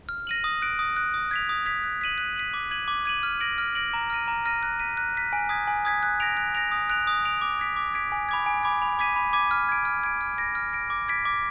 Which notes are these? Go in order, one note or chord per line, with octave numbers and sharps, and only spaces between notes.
F6
A#6 D#7 F#7
D#6
F#6 D7
D#6
F#6 D7
D#6
G#6 B6 F7
D#6
G#6 B6 F7
F#6
B6 D#7 F#7
F#6
B6 D#7 F#7
D6
G#6 D#7 F#7
D6
G#6 D#7 F#7
F6
A#6 D7 F#7
F6
A#6 D7 F#7
A#5
F6 A#6 D#7
A#5
F6 A#6 D#7
F#6
B6 D#7
F#6
B6 D#7
G#5
D#6 G#6 B6
G#5
D#6 G#6 B6
F#6
A#6 D7 F7
F#6
A#6 D7 F7
D#6
F#6 D7 F7
D#6
F#6 D7 F7
D6
G#6 B6 D7
D6
G#6 B6 D7
G#5
B5 D6 G#6
G#5
B5 D6 G#6
B5
D6 G#6 B6 D#7
B5
D6 G#6 B6 D#7
F6
G#6 D7
F6
G#6 D7
F6
A#6 D7
F6
A#6 D7
D6
G#6 B6 D7
D6